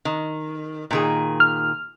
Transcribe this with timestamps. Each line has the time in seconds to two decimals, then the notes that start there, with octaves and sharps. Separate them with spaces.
0.05 D#3
0.91 A#2 D#3 G#4
1.40 F6